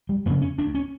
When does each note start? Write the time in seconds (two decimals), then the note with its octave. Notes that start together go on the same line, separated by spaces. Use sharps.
0.09 G3
0.26 F2 A#3
0.29 C#3
0.42 C#4
0.58 D2 D4
0.75 C#4